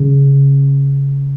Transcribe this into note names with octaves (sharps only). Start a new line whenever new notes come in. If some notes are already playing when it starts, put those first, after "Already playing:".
Already playing: C#3